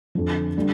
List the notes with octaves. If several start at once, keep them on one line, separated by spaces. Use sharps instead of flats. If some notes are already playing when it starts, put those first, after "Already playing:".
F2 D3 F3
D3 G3